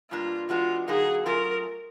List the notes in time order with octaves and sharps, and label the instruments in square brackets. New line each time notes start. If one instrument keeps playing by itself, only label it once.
[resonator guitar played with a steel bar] B2 G3 A#3 D4 [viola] F4
[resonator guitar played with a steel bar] E3 G#3 B3 D4 F#4 [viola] F4
[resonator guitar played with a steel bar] D3 F#3 A#3 D#4 F#4 [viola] G#4
[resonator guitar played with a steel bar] F#3 A3 C#4 F4 G#4 [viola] A#4